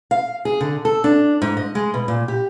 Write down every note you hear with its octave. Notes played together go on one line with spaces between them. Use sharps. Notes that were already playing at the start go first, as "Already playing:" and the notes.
F5
G#4
D3
A4
D4
G#2
D#5
G#3
B2
A#2
G4